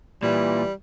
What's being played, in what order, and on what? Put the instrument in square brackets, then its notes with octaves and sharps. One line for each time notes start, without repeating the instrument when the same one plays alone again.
[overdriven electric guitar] A#2 [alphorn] E3 [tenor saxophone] G3